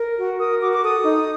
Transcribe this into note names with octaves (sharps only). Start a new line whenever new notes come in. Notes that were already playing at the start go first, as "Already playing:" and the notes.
Already playing: A#4
F#4
A#4 D#6
F#4 D6
D6
A4 D#6
D#4